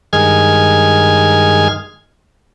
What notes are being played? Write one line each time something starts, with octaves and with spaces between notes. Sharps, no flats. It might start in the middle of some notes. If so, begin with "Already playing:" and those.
G2 D#3 G#3 G#4 F6 G#6